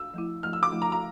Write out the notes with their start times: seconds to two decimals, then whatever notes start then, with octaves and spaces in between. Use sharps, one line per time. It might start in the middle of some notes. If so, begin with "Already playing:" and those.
Already playing: E6
0.14 F3 A3 E4
0.43 F3 A3 E4 F6
0.53 E6
0.63 D6
0.72 F3 A3 E4
0.82 A#5
0.92 A#5